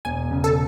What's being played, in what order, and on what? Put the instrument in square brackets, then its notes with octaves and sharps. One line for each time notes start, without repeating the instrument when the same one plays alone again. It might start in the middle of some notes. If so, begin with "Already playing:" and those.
[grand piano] E1 [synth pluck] G#5
[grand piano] C#3
[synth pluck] A4